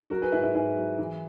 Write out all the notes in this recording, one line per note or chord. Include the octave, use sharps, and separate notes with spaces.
F#3 F#4 A#4
G#4 B4
G#2 E4 G#4
E4
G#2 E4 G#4
F#3
E3